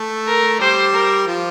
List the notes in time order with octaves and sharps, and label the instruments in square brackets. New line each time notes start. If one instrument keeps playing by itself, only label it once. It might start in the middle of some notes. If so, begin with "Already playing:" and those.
Already playing: [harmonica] A3 A4
[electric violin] A#4
[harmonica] G3 G4 [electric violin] C5
[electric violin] A#4
[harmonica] F3 F4